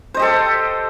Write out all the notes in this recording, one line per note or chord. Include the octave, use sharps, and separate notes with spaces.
G4 A4 C5 D#5